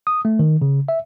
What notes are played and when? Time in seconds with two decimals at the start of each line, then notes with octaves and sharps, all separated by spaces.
0.07 D#6
0.25 A3
0.39 D#3
0.62 C#3
0.88 E5